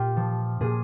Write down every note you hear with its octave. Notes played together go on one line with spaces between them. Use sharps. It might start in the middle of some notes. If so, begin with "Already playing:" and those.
Already playing: A#2 F4 G4
F3
A#2 G#4